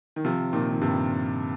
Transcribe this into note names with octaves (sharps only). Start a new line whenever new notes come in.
D#3
C3 F3
A#2 D#3
D#3
G2 C3